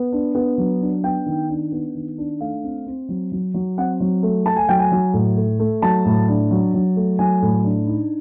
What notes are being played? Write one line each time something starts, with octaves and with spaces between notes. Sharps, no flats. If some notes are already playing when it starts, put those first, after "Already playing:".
Already playing: B3
D4
B3
F#3
D4
B3 G5
D#3
D4
B3
D#3
D4
A3 F5
C4
C4
F#3
F#3
F#3
C4 F#5
F#3
A3
A3 A5
G#5
F#3 G5
G#5
F#3
A2
A3
A3
F#3 A5
A2
D4
F#3
F#3
A3
F#3 G#5
A2
D4
D#4